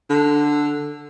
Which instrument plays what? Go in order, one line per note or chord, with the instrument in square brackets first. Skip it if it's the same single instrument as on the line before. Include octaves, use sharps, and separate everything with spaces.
[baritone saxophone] D3